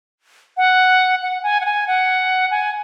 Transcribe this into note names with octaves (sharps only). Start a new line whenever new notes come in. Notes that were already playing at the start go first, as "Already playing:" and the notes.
F#5
F#5
G#5
F#5
G#5
F#5
G#5